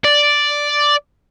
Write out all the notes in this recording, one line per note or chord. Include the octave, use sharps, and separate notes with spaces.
D5